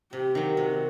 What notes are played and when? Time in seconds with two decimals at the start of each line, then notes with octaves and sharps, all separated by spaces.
0.12 C3 G4
0.35 D#3 F#3
0.57 C3 F#4